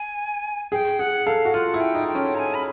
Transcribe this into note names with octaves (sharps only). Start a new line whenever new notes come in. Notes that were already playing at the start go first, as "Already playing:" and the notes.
Already playing: G#5
G#4 G5
G#4 F#5
A4 F5
F#4
F4 F#5
E4
G5
D#4
G5
C#4
A#5
G#5
B5